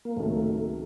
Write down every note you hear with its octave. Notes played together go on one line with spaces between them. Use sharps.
A#3
C#2 C3 D#3 F#3 A3